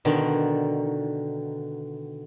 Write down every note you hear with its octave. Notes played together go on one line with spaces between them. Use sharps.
B2 D3 D#3